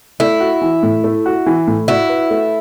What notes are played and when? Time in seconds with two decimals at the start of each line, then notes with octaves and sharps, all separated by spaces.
0.20 A3 E4
0.40 F#4
0.61 E3
0.83 A2
1.04 A3
1.26 F#4
1.46 E3
1.67 A2
1.88 E4 F#4
2.09 B4
2.30 A3